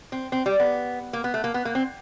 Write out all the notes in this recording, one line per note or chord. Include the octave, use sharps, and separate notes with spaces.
C4
C4
G3
B3
A#3
B3
A3
A#3
B3
A#3
C4